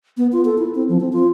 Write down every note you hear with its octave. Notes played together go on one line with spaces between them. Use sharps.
B3
F4
A4
E4
C4
F3
C4
F4